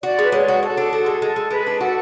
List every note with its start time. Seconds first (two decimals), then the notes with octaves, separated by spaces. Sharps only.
0.03 F#4 D5
0.19 G#3 B4
0.32 G#3 C#5
0.48 F#4
0.62 F#4 A4
0.77 D4
0.92 F#4 A4
1.06 G#3
1.21 G#3 A4
1.36 G#3
1.51 G#3 B4
1.67 D4
1.81 F#4 A4